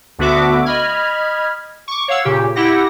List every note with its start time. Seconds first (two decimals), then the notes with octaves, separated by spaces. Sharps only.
0.19 D2 D3 B3 F#4 E5 D6
0.65 D#5 B5 F6 G#6
1.88 C#6 D6
2.08 C#5 F5 F#5 E6
2.25 A#2 C#3 G4
2.56 E4 G4 F#5 A#6